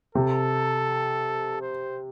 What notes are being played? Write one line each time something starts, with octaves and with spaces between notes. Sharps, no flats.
C3 A4
C5